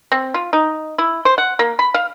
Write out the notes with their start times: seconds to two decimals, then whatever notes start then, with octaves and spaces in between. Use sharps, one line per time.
0.12 C4
0.34 F4
0.53 D#4
0.98 E4
1.25 C5
1.38 F#5
1.59 A#3
1.79 B5
1.94 F5